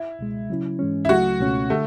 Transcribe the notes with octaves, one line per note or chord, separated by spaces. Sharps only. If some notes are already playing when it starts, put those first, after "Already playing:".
Already playing: E4
C#2 B2 G#3
C#3 F#3 C#4 E4
G#2 E3 G#3 C#4
E4
C#2 C#3 F#3 A3 F#4
C#2 B2 A3 C#4 F#4
D3 A3